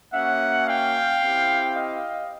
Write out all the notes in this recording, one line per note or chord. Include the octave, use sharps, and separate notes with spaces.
A#3 C#4 F#4 E5 F#5
F5 G5
C4 E4 G4
D#5 F5